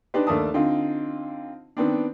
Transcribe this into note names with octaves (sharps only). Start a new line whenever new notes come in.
D4 D#4 G4 B4 C5
D#2 A3 A#3 D4 A5 D#6
D3 C4 D#4 F4
D#3 B3 C4 D4